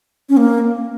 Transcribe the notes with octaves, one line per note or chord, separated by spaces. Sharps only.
C#4
A#3